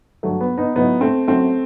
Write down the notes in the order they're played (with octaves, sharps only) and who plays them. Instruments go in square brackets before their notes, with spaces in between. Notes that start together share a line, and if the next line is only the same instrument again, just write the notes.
[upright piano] G2 F#3 A3
B3
B3 D#4
A2 F#3 B3 D#4
A3 C4
F#2 F#3 A3 C4